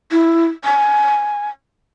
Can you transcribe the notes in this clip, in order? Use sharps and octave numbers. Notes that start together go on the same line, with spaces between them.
E4
G#5